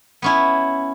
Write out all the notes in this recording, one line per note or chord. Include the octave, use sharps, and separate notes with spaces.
B3 C#4 E4